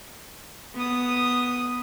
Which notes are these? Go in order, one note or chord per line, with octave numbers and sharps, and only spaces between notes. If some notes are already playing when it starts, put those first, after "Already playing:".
B3 D#6